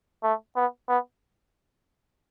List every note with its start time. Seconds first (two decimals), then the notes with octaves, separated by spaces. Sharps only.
0.24 A3
0.56 B3
0.88 B3